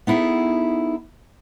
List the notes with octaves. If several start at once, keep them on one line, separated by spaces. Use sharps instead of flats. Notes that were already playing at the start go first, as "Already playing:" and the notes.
B3 D#4 E4 G#4 A4